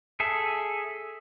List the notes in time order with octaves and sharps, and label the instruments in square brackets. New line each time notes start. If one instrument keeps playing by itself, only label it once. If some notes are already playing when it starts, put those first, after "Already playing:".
[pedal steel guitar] G#4 A4 E5